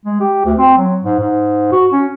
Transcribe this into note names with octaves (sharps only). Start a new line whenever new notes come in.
G#3
G4
D2
C4
F#3
G#2
G#2
F#4
C#4